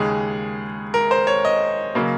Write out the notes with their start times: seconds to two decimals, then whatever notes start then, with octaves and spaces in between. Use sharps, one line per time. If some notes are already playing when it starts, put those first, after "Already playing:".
Already playing: D#2 C#3 G#3 G#4
0.94 A#4
1.11 C5
1.27 C#5
1.45 D#5
1.95 C#3 F#3 A#3